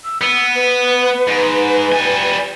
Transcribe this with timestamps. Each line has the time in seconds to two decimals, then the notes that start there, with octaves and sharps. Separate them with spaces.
0.04 E6
0.22 B3 E6
0.55 B4
1.28 G#2
1.92 G3 G#5